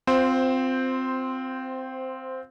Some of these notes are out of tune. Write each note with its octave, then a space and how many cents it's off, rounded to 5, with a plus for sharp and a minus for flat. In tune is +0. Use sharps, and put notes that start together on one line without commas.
C4 -10 F4 +20 C5 +0